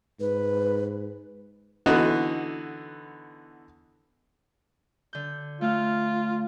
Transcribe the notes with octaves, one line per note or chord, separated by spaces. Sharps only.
G#2 B4
D3 E3 B3 D#4 F#4
D3 G6
A3 F4 F5